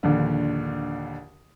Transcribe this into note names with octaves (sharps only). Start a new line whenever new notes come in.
A#1 D#2 D3